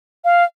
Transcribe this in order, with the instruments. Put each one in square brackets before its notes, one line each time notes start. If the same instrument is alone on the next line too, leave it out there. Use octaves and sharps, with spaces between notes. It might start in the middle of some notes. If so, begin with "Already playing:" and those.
[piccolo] F5